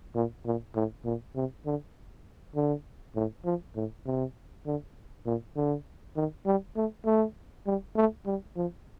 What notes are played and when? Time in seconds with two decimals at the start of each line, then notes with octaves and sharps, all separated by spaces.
0.15 A#2
0.46 A#2
0.76 A2
1.05 A#2
1.35 C3
1.66 D3
2.55 D3
3.15 A2
3.45 F3
3.76 A2
4.06 C3
4.66 D3
5.26 A#2
5.56 D3
6.16 D#3
6.46 G3
6.76 A3
7.06 A3
7.66 G3
7.96 A3
8.26 G3
8.56 F3